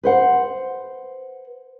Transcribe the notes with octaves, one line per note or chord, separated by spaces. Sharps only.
B4 C5 F#5